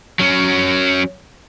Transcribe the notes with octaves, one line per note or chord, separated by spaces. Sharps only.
F#3 C#4